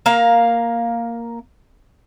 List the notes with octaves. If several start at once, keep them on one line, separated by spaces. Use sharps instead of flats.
A#3 A#4 F5